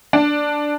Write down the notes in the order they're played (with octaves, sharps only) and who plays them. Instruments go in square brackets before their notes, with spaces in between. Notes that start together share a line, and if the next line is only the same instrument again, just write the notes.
[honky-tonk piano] D4